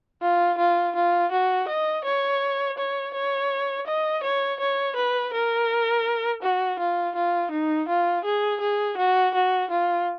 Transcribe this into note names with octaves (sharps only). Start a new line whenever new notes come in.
F4
F4
F4
F#4
D#5
C#5
C#5
C#5
D#5
C#5
C#5
B4
A#4
F#4
F4
F4
D#4
F4
G#4
G#4
F#4
F#4
F4